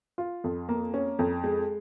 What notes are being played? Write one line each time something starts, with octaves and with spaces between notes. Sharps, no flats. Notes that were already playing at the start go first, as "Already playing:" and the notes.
F4
F2
A#3
C#4
F2
G#3